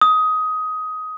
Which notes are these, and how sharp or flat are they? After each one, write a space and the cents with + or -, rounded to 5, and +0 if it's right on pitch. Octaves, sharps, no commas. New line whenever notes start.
D#6 +15